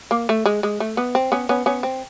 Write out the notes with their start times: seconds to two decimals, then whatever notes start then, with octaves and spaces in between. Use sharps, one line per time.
0.11 A#3
0.29 A3
0.46 G#3
0.63 G#3
0.80 A3
0.97 B3
1.15 C4
1.32 B3 C#4
1.49 B3 C#4
1.66 B3 C#4
1.83 C4